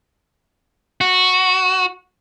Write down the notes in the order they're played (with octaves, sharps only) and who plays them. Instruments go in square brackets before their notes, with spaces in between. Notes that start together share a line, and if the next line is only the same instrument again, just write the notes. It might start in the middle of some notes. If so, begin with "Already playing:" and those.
[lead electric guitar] F#4